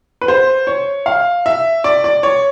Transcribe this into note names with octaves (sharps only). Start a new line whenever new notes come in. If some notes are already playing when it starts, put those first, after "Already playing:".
B4
C5
C#5
F5
E5
D5
D5
C#5